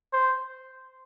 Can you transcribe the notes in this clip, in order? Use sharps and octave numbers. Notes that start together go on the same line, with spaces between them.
C5